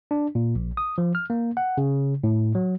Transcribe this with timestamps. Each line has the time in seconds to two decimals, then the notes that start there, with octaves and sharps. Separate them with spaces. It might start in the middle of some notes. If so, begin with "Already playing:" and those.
0.11 D4
0.35 A#2
0.55 A#1
0.77 D#6
0.98 F3
1.15 F6
1.30 A#3
1.57 F#5
1.77 C#3
2.24 A2
2.55 F#3